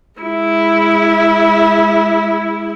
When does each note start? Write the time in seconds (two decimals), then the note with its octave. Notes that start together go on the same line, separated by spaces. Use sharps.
0.20 G#3 E4